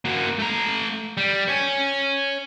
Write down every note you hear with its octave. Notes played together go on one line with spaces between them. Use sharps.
A#3 F#4
A3 A#5
G3
C#5 G#5